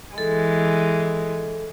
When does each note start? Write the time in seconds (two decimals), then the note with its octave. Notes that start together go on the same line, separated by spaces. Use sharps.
0.18 E3 G#3 A4